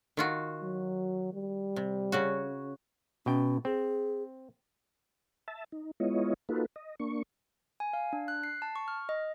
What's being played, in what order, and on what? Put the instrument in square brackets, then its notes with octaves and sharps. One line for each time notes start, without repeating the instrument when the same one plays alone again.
[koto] D#3 F4 F#4
[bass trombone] F#3
G3
[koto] C3
C#3 C#4 F#4
[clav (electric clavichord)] B2 G5 [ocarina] C#4
[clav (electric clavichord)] C4 [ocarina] G#4
[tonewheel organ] E5 A5
D#4
G#3 B3 E4 F4 C#5 D#5
A#3 D#4 F4 F#4 A4 B4
D#5
A#3 D4 C#6
[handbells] G#5
F5
D4
F#6
C7
A5
C#6
F6
D#5